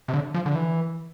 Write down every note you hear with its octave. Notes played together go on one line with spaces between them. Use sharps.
C3
D3
F3
D3
E3